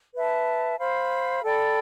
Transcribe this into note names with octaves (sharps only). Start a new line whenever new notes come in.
B4 E5 A5
C5 F5 B5
A4 D5 G5 B5